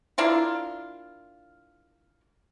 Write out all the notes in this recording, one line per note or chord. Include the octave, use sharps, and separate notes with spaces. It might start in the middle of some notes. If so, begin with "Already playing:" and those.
A#3 D4 E4 F4